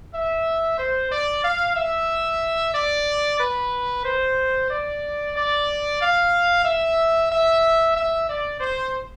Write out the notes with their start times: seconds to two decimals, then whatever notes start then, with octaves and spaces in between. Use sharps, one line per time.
0.13 E5
0.78 C5
1.11 D5
1.43 F5
1.76 E5
2.74 D5
3.39 B4
4.04 C5
4.70 D5
5.35 D5
6.00 F5
6.64 E5
7.30 E5
7.95 E5
8.28 D5
8.60 C5